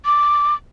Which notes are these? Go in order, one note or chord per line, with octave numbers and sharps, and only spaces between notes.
D6